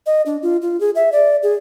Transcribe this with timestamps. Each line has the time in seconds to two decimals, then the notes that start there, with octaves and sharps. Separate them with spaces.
0.06 D#5
0.26 D4
0.43 F4
0.62 F4
0.80 G#4
0.95 E5
1.12 D5
1.43 G#4